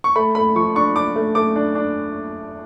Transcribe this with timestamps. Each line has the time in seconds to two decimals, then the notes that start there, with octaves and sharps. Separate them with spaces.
0.04 C#6
0.16 A3 B5
0.35 A3 B5
0.55 F3 C#6
0.75 D4 C#6
0.95 D4 D6
1.16 A3
1.35 A3 D6
1.56 D4
1.75 D4